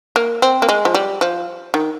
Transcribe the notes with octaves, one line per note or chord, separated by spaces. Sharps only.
A#3
C4
A#3
G#3
F3
G3
F3
D#3